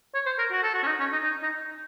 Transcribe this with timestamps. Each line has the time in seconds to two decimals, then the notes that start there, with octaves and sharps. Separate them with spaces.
0.14 C#5
0.26 C5
0.38 A#4
0.51 F#4
0.63 A4
0.74 F#4
0.83 C#4
0.87 D#4
1.00 C#4
1.12 D#4
1.24 D#4
1.43 D#4